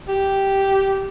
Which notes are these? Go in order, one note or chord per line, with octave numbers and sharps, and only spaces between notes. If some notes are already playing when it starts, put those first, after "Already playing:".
G4